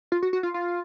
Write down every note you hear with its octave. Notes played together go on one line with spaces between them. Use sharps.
F4
F#4
F#4
F4
F4